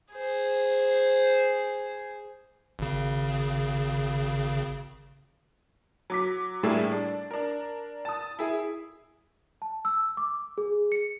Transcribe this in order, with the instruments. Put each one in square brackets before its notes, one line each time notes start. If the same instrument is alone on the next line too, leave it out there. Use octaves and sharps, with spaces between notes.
[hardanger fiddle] G#4 C5
[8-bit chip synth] G#1 C#3
[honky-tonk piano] F#3 D6 B6
A2 G3 A#3 D4 E4 G#4
D4
D4 A#4
A5 D#6
E4 G#4
[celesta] A5
E6
D6
G#4
C#7